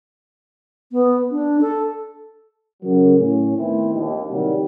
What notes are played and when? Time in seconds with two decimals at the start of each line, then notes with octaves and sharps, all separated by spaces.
0.92 B3
1.31 D4
1.61 A4
2.83 C#3 F#3 A#4
3.19 A2 C#4
3.57 D#3 A3 B3 C4 E4
3.94 A#1 D#2
4.30 A2 C3 D#3 F#3 G3